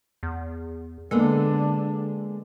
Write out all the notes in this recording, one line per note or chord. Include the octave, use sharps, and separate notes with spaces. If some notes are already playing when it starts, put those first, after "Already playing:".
E2
D3 G#3 A#3 B3 D4 A4